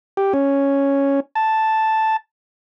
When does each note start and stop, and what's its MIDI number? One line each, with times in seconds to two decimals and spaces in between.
0.17 0.33 67
0.33 1.20 61
1.35 2.16 81